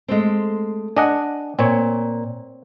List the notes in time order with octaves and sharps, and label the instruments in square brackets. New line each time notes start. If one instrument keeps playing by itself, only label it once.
[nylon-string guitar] G#3 A3 C4
[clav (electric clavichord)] D4 D#5 F#5 [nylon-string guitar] G#5
[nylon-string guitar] A#2 [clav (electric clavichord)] C4 C#5